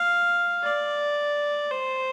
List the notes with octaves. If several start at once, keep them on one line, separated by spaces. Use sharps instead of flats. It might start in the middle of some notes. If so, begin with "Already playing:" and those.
Already playing: F5
D5
C5